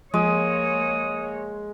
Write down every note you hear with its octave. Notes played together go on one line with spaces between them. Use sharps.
F3 G#3 A#3 C#5 D#6